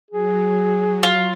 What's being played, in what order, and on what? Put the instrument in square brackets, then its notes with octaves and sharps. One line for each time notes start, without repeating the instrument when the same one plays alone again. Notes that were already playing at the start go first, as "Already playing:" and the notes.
[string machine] F#3 [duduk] G#4
[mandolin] F4